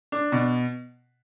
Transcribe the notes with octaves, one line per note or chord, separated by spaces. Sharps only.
D4
B2